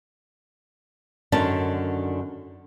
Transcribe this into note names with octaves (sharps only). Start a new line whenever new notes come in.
F#2 D3 D#3 C#4 D4 A5